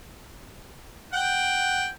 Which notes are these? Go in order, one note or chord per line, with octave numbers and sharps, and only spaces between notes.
F#5 G5